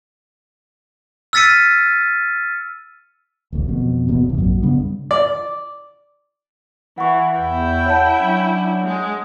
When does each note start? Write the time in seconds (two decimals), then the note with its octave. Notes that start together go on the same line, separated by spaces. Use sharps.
1.33 E6 F6 A6 B6 C#7 D#7
3.52 D1 A1 D2
3.68 F2 B2
4.08 D#1 E2 B2
4.25 D#2 C3
4.38 A#1 F#2
4.62 C#3 G3 B3 D4
5.11 D5
6.98 E3 F#5 C#6
7.35 E2 E4 G5
7.86 C#5 F#5 A5
8.19 F#3 C#4 D4
8.83 G#3